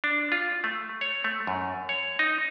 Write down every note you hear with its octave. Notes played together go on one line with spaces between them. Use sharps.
D4
F4
A3
C#5
A3
F#2
C#5
D#4